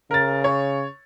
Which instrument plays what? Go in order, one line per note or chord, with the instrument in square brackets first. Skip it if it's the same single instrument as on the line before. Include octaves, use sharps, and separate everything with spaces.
[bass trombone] C#3 [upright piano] A#4 A6
[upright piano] C#5